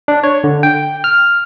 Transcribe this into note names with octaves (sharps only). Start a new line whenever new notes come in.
D4
C#5
D3
G5
F6